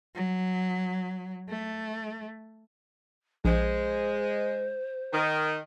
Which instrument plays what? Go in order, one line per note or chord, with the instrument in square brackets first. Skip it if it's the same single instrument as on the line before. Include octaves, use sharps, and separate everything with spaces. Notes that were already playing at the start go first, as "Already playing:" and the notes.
[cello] F#3
A3
[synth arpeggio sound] A#1 [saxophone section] G#3 [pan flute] C5
[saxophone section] D#3